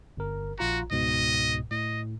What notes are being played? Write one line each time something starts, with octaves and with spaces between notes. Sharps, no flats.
G1 A#4
A#1 F4 F#4 A#5
C#2 G#2 B2 D#5
A2 D#5